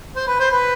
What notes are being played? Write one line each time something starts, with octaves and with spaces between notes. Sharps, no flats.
C5
B4
C5
B4